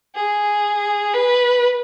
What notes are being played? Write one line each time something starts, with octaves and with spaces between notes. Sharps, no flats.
G#4
B4